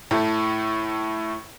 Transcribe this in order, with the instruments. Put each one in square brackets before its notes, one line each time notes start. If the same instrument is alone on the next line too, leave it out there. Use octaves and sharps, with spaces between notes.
[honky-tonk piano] A2 A3